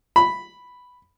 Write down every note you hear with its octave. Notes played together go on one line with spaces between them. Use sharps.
B5